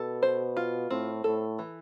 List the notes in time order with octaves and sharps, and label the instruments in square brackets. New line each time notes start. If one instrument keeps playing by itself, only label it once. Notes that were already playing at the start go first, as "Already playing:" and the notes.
Already playing: [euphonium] B2 [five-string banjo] A4
[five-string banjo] C5
F4
[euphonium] A2 [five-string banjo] C4
[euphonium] A2 [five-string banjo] A4
[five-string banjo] E3